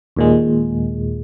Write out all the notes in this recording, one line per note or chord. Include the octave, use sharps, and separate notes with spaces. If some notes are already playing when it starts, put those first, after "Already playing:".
D#2 A#2 G#3